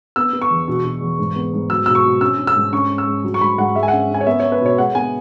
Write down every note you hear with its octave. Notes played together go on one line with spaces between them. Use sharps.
B3 E6
B3
C#6
E2
B2
B2
E2
G#2
B3
G#2
F#3 E6
B2 E6
C#6
B2
C#4 E6
C#4
E6
G#2
C#4 C#6
C#4
E6
G#2
F#3
C#6
G#2 B5
G#2 F#5
G#3 E5
G#5
C#4 F#5
C#4 G#5
C#5
B3 E5
B3 C#5
B4
B2 C#5
G#3 F#5
B3 G#5